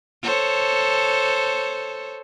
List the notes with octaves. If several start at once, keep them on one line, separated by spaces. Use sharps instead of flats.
A4 C5 C#5